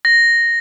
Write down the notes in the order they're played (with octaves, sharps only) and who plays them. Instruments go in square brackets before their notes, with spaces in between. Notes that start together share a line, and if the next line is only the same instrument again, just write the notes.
[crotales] A#6